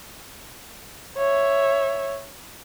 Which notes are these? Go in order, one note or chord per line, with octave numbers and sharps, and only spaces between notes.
C#5 E5